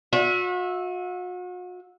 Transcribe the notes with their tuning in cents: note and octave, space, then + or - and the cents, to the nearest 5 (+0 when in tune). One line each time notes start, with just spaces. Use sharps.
F#4 -40 E5 -5